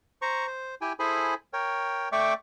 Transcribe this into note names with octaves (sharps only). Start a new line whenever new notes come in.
C5 A#5 C#6
C5
E4 G4 G5 G#5
E4 G#4 A4 C5 G#5 B5
A#4 C#5 G5
A3 D5 E5 G5 C#6 D6